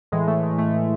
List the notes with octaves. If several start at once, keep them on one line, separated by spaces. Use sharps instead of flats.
A2 E3 G#3
A3
G#3
A3
A3